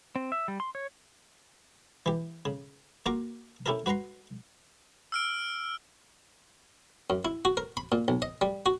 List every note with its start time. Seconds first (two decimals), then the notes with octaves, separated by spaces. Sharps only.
0.16 C4
0.32 E5
0.48 G3
0.60 C6
0.75 C#5
2.06 E3 G4
2.45 C#3
3.06 A#3 F4 F#4 A#5 D6
3.66 C#4 E4 G4 A4 A#4
3.86 F#4 B4 F#5 A#5 C6
5.12 E6 F6 D7
7.10 F#2
7.25 E4
7.45 F#4
7.57 A#4
7.77 B5
7.92 A#2
8.08 B1
8.22 D#5
8.41 G3
8.66 F#4